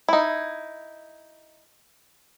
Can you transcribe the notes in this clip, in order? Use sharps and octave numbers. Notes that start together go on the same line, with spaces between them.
D#4 E4